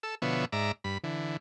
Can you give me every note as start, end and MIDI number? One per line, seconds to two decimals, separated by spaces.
0.03 0.15 69
0.03 0.15 88
0.22 0.45 47
0.22 0.45 50
0.22 0.45 53
0.22 0.45 59
0.22 0.45 73
0.22 0.45 76
0.52 0.72 44
0.52 0.72 74
0.52 0.72 76
0.52 0.72 82
0.84 0.98 43
0.84 0.98 83
1.04 1.37 50
1.04 1.37 52